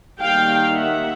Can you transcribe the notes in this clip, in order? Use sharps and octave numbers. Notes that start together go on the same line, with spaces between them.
D#3 G3 A#3 F5 G5
E5 F#5